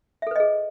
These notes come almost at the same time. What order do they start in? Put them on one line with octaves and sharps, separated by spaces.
E5 A4 B4 D#5 G#4